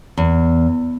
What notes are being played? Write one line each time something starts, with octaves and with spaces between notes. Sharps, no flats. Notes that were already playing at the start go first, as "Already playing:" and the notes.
E2